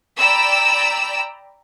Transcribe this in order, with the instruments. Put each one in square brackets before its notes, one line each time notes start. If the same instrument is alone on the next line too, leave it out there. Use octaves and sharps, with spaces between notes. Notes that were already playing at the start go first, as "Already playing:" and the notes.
[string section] D5 G5 A#5 B5 E6